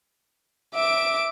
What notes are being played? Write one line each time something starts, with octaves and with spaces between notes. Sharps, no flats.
E5 D6 D7